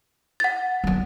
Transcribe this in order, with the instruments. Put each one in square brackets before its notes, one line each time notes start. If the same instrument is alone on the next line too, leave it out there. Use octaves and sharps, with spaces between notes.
[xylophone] F#5 A6
[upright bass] F#3 B3